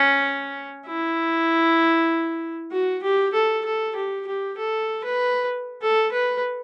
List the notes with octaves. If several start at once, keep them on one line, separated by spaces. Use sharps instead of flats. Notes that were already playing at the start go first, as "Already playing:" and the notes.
Already playing: C#4
E4
F#4
G4
A4
A4
G4
G4
A4
B4
A4
B4